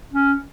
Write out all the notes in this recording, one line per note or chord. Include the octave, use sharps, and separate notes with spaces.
C#4